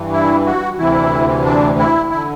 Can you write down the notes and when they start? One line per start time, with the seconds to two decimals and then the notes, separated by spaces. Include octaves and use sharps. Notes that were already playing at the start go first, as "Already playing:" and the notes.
Already playing: G2 E3
0.13 E4
0.46 F#4
0.79 D2 C3 E3 E4
1.45 D4
1.78 E4
2.11 D3 E4